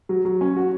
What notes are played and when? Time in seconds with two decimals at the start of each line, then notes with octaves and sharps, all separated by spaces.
0.09 F#3
0.25 F#3
0.41 C#4
0.56 F#4